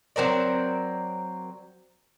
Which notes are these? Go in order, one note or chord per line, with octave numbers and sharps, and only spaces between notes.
F#3 C4 A#4 D5